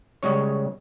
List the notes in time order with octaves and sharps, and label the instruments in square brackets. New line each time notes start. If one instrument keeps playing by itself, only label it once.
[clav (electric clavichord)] C#3 G3 G#3 C#4 C#5